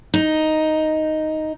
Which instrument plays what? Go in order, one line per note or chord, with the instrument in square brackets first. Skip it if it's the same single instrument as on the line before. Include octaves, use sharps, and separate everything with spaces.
[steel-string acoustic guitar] D#4